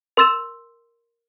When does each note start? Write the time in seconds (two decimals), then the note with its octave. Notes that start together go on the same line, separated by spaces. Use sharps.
0.17 A#4 C6 E6 A6 E7